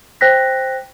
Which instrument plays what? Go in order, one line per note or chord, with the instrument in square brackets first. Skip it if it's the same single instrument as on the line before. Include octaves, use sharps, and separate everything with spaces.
[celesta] C5 G5 F#6 A#6 B6